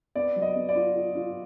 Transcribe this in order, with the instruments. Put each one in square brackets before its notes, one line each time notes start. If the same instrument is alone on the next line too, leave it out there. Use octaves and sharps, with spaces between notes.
[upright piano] B3 [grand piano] D5
[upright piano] F#3
[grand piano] D#5
[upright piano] B3
[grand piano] D5
[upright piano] F4
F4
F4